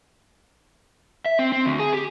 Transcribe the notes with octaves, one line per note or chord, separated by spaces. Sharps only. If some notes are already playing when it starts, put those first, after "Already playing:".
E5
C4
C4
D2
G#4
G4